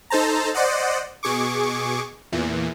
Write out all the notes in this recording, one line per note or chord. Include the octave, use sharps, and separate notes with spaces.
D#4 A4 C5 A5 A#5
C5 D5 D#5 F#5
B2 G#4 C#6 D6
E2 A#2 E3